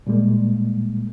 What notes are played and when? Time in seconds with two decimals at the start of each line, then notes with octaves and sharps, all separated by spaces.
0.07 A#2 G3 G#3 A#3